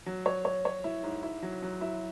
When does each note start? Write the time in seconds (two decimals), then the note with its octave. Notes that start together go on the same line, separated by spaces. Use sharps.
0.06 F#3
0.26 C#5
0.45 C#5
0.65 C#5
0.84 E4
1.03 G#2
1.23 E4
1.42 F#3
1.62 F#3
1.81 E4